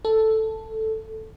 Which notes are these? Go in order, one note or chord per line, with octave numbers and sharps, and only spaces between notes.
A4